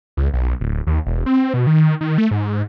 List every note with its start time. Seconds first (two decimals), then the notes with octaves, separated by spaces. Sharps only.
0.17 C#2
0.33 B1
0.61 D1
0.87 D#2
1.06 E1
1.26 C4
1.54 B2
1.67 D#3
2.01 D#3
2.18 A3
2.31 G#2